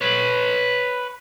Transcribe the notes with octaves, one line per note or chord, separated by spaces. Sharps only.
B4 C#5